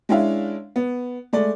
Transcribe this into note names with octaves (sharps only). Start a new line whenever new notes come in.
G#3 C#4 D4 E4 E5 F5
B3
G#3 A3 D5